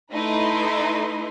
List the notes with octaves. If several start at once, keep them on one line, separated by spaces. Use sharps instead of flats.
A3 D#4 E4 B4 D#5 C6